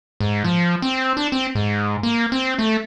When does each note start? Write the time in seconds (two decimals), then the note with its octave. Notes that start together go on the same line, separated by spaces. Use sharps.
0.20 G#2
0.44 F3
0.82 C4
1.17 D4
1.32 C4
1.55 G#2
2.03 A#3
2.32 C4
2.58 A3